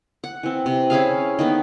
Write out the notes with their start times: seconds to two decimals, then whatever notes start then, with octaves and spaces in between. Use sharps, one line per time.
0.24 F#5
0.43 E3 C4
0.66 C3
0.90 C#4 E4 G#4 F5
1.39 D#3 A#3 B3